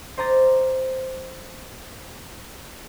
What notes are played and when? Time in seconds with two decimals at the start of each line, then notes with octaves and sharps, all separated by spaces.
0.17 C5 D#5 A#5 D6 A6